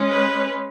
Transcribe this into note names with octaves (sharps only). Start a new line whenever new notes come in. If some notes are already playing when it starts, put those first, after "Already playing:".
Already playing: G#3 C#4
B4